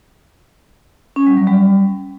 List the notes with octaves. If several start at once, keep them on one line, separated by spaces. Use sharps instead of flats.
C#4
G3
F#3
G3